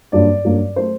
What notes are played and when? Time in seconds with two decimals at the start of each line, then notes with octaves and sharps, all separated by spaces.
0.12 G2 F#3 A#3 D5
0.44 G2 F#3 A#3
0.76 F#3 A3 C5